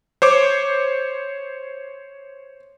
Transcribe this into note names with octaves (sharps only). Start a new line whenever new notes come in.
C5 C#5 D6